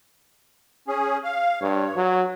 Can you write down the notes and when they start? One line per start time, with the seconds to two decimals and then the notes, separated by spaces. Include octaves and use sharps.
0.88 C#4 G#4
1.24 F5
1.61 G2 C#5
1.95 F#3